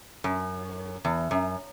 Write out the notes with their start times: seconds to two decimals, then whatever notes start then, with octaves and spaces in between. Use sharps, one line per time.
0.24 F#2
1.05 E2
1.31 F#2